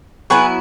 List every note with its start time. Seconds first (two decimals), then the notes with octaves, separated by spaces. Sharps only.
0.30 F#3 B3 E4 G#4 B4